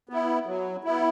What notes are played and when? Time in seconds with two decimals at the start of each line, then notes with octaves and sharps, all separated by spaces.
0.09 B3 E4
0.47 F#3
0.84 B3 E4